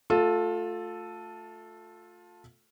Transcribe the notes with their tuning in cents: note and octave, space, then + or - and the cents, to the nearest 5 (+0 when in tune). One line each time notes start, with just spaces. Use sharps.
A3 +0 F4 +25 A4 +0